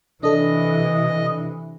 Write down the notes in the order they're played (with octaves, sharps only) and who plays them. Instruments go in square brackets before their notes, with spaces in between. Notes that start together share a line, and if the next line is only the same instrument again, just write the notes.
[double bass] C3 E3 [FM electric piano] D4 A4 [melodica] D#5